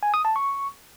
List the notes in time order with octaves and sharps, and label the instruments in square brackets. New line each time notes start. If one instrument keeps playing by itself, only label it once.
[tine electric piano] G#5
D#6
A5
C#6